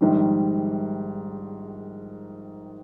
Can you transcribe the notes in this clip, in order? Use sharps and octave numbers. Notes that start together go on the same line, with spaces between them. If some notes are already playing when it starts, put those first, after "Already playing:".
A#1 G#2 D#3 G3